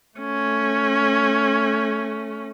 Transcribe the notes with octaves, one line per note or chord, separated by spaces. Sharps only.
A3 C#4